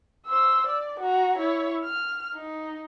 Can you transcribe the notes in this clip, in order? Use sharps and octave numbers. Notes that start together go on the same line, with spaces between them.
C5 E6
D5
F#4 A#5
E4 C#5
F6
D#4